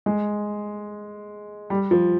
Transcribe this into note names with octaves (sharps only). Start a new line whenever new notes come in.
G#3
G3
F3